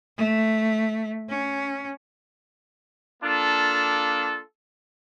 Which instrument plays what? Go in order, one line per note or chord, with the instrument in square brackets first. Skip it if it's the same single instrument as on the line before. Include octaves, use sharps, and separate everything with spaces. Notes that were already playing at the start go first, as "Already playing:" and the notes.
[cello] A3
C#4
[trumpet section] A#3 D4 F4 A4